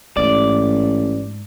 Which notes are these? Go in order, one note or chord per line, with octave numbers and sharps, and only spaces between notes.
A1 G#2 D5